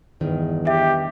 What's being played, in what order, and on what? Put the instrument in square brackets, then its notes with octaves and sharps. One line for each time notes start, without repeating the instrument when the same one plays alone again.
[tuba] E2 [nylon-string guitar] G2 D#3
[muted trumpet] G4 [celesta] E5